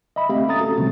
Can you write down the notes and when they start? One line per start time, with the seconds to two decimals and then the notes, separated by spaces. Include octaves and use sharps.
0.16 D#5 E5 B5
0.30 A3 C4 G4 E5 F5
0.48 C#4 A4 A#5 D#6 A6
0.60 F#4 A4
0.78 C3 D#3 F3 G3 A3 C4